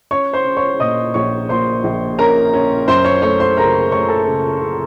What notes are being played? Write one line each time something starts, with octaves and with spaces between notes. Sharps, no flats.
C#4 C#5 C#6
C5 C6
C#4
C#5 C#6
A#2 D#5 D#6
A#1 C#5 C#6
A#2 C5 C6
A#1
C#4 A#4 A#5
C#4
F#2 C5 C6
C#5 C#6
A3 C#5 C#6
C5 C6
C#3 A#4 A#5
A3 C#5 C#6
A4 A5
C#3
C#3